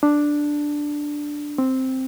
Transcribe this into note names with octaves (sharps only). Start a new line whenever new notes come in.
D4
C4